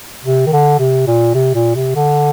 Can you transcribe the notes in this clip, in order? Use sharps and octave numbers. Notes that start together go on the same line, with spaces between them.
C3
D#3
D3
C3
A#2
C3
A#2
C3
D3